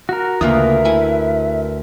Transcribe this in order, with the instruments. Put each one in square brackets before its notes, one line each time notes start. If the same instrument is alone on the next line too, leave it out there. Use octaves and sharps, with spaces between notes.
[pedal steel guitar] F#4 A#4
[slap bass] D2 [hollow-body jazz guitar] C#3 A#3 F4 [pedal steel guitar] A#4 B4 D#6 [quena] E5
[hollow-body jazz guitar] E4 G#5